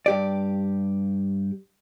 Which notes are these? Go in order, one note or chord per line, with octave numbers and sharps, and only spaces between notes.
G2 G4 D5